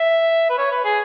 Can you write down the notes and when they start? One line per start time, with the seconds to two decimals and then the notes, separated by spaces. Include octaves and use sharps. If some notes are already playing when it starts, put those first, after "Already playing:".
Already playing: E5
0.49 B4
0.58 C#5
0.71 B4
0.85 G#4